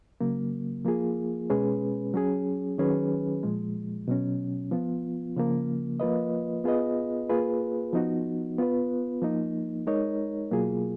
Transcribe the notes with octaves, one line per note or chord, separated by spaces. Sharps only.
C#3 F#3 A#3
F3 A#3 F4 G#4
B2 G#3 C#4 G#4 B4
F#3 C#4 G#4
D#3 F#3 C#4 G#4 B4
A#2 F3 G#3
B2 F#3 C#4
F3 B3 F4
C#3 F3 A#3
F3 A#3 F4 B4 D#5
B3 F4 G#4 B4 D#5
A#3 F4 G#4 B4
F3 B3 D#4 F#4
B3 F4 B4
F3 A#3 D#4
G#3 D#4 A#4 C#5
B2 F#3 A#3 F4 G#4